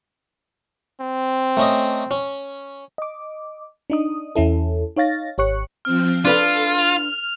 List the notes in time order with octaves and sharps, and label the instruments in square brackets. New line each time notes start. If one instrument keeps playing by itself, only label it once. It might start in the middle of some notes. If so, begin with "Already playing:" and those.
[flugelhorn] C4
[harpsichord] A3 C#4 D#5
C#4
[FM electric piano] D#5 D6
D4 D#4 D#6
E2 C#4 E4 A4
D#4 C#5 F5 A6 A#6
G#1 G4 C#5 C#6 F#6 C#7
[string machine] F3 C4 [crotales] F6
[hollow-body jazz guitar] D4 B4 F5 [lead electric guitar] F4 [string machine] A4
[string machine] F6 [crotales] F7